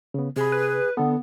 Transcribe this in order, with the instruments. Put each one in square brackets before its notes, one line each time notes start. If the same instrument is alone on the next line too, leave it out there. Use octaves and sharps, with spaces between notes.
[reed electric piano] C#3 B3
[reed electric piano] C3 B5 [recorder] G#4
[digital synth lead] B4
[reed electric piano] D3 A4 [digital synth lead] B3